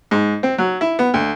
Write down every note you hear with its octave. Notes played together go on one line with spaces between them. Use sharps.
G#2
C4
F#3
E4
B3
D2